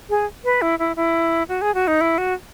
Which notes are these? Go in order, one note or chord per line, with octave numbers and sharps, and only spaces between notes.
G#4
B4
E4
E4
E4
F#4
G#4
F#4
D#4
E4
F#4